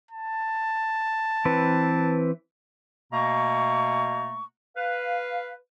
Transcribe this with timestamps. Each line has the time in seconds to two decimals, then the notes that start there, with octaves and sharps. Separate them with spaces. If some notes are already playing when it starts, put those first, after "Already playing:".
0.11 A5
1.45 E3 C4 B4
3.12 B2 A3 A#3 A#5 C#6
4.76 B4 F5